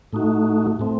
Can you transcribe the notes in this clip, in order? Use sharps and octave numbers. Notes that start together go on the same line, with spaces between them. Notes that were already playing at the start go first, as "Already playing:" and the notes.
A2 A3 D#4 F#4
A2 A3 C4